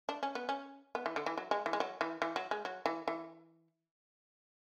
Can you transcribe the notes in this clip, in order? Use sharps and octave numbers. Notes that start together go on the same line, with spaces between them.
D4
C#4
B3
C#4
B3
E3
D3
E3
F#3
G#3
E3
G#3
F#3
E3
E3
F#3
G#3
F#3
E3
E3